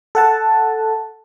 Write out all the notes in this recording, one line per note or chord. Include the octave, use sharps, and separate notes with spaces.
A4 F#5 A5